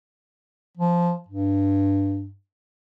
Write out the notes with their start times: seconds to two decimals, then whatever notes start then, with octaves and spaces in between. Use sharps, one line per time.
0.78 F3
1.28 G2